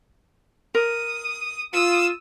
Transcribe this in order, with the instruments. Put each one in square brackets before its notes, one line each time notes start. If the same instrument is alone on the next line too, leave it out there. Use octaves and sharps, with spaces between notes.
[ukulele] A#4 [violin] D#6
[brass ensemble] F4 [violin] D#6 E6